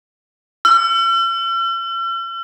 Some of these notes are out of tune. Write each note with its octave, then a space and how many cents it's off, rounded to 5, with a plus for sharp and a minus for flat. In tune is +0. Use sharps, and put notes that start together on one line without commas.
E6 +45